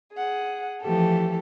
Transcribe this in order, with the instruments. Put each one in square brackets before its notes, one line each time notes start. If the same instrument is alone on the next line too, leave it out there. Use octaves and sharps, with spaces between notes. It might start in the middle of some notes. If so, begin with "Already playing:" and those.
[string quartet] G#4 F#5
E3 F3 A3 G4 A4